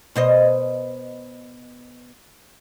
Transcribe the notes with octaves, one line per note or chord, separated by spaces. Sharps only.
B2 C5 D#5